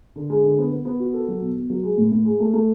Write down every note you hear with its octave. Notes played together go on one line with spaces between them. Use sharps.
D3
G#3
D3
B3
B3
B3
F#4
A4
F#3
B2
B2
F#3
G#3
A2
A2
G#3
A3
A3